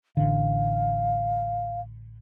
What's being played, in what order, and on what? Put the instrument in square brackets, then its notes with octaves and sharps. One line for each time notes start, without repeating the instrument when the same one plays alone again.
[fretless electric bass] A1 D3 [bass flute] F5